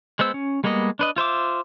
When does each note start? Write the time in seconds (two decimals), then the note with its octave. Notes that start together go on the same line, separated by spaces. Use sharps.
0.19 G#3 B3 C5 E6
0.34 C#4
0.64 G3 G#3 A#3 B3 D#5
0.99 D4 B4 D#5
1.16 F4 C5 E5 D6